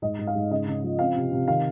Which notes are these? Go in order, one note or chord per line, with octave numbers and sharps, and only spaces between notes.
G#2 D#5
G#2
F5
G#2
C#3 D#5
C#3
F3
C4 F5
C3
C3
D#3 F5